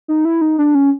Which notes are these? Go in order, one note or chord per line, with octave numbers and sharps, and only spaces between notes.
D#4
E4
D#4
D4
C#4